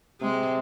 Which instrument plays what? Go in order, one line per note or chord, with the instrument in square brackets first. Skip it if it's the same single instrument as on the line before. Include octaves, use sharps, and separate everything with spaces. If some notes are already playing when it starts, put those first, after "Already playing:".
[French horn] C3 [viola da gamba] G#3